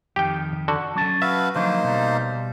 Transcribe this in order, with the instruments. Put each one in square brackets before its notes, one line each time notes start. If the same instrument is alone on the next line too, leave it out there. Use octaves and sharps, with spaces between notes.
[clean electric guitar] F2 D#3 [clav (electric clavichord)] G4 G5
[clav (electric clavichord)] D3 F#4
[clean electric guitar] F#3 C#4 A5
[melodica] F#4 B4 F5 [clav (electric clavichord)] E5
[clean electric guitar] D3 F3 F#3 [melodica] A#3 D#4 C5
[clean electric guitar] B2 G3